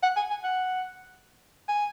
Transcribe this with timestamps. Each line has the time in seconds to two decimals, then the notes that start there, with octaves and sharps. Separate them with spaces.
0.03 F#5
0.16 G#5
0.30 G#5
0.44 F#5
1.69 G#5